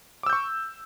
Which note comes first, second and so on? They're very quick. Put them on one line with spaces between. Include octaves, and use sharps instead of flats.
D6 E6 G6 C#6